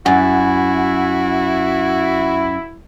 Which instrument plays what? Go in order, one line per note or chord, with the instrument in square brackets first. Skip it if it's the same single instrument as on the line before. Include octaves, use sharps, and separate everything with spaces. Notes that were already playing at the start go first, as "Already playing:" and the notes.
[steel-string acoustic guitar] F#2 [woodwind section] E4 [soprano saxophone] F#4 [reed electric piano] F#5 G#5 A6